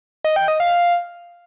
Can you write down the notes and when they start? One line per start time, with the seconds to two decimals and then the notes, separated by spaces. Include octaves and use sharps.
0.24 D#5
0.36 G5
0.48 D#5
0.60 F5